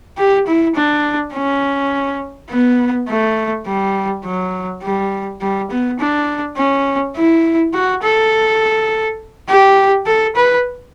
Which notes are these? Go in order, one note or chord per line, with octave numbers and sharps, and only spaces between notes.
G4
E4
D4
C#4
B3
A3
G3
F#3
G3
G3
B3
D4
C#4
E4
F#4
A4
G4
A4
B4